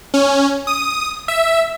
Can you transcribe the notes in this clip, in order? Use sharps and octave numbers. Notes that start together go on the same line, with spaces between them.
C#4
D#6
E5